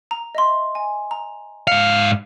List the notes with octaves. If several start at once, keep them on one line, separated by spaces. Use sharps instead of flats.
A#5
D#5 E5 C6
G#5
A#5
G#2 F5 C#7